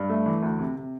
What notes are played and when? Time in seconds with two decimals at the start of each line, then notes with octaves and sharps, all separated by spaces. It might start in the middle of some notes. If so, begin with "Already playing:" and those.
Already playing: G2
0.09 A3
0.26 E3
0.42 D2
0.59 C3
0.76 C3